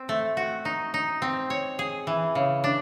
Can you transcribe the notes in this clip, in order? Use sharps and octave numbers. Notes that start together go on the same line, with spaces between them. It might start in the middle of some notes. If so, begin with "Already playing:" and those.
Already playing: C4
A3
F#4
D#4
D#4
C4
C#5
G#4
E3
C#3
D4